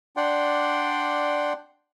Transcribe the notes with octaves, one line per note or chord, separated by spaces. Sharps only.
D4 D5 F#5 G5 C6